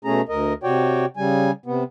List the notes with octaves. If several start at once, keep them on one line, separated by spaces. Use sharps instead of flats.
B2 A3 C#4 G#4 A#5
D2 A#4 D#5
C3 F#4 C#5 D5 G5
C#3 G3 G#5
C3 B3